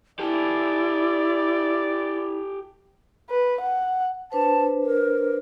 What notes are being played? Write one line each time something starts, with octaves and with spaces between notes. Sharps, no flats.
E4 G4 A4 D5
B4
F#5
D4 B4 C5 A5
A#4